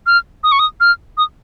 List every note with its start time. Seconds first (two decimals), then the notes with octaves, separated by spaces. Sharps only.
0.06 F6
0.43 D#6
0.52 C#6
0.59 D#6
0.80 F6
1.17 D#6